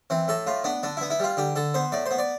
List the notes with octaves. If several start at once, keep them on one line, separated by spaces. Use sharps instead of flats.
E3 C4
A2 A4
A2 F4
B3 D4
D3 D4
B3 E4
E4
G3 F4
D3 G4
D3 A4
B3 C5
A2 D5
C5
B3
D5